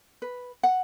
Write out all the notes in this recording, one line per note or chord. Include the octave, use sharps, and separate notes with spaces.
B4
F#5